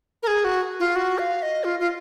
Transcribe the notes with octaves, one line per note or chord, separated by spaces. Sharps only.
A#4
G#4
F#4
F4
F#4
F5
D#5
F4
F4